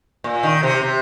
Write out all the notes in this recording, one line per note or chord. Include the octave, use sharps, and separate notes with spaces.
A#2
D#3
C3
C3